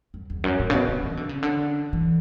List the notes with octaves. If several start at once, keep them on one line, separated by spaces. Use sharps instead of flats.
F#2
E2
F#2
A2
C#3
B2
C#3
E3
D3
C#3
D3
E3